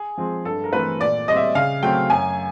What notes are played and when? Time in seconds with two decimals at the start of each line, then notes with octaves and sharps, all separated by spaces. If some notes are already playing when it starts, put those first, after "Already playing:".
Already playing: G#4
0.17 F3 G#3 C4
0.45 G2 A4
0.64 A#4
0.72 E3 A3 C4 B4
1.00 A#2 D5
1.28 G3 C4 D#5
1.36 E5
1.55 C#3 F5
1.83 F#3 A3 C4 G5
2.10 F#2 G#5